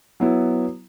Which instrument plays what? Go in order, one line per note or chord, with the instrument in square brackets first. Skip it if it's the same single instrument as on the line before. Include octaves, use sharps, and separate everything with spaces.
[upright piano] F#3 B3 E4